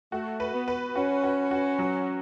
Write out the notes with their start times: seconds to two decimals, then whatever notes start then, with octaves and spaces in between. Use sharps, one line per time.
0.12 A3 F#4
0.40 B4
0.53 B3
0.68 B4
0.95 C#4 F#4
1.23 F#4
1.51 F#4
1.79 F#3